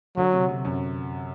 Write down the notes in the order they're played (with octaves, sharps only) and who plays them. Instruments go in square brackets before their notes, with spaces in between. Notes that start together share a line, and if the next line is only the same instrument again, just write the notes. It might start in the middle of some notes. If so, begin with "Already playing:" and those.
[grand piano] D3 [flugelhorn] F#3
[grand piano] C3
C3
F#2